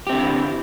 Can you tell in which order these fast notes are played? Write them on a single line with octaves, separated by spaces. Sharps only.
G4 C4 D3 E4